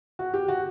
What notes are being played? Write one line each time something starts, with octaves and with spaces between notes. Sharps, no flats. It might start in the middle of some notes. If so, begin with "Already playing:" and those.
F#4
G4
F#4